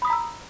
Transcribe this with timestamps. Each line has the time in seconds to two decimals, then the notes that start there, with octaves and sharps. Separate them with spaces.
0.02 B5
0.05 D#6
0.07 B6
0.10 A#5
0.13 E6